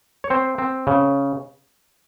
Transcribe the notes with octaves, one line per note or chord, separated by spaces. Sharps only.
C#5
C4 C5
C4
C#3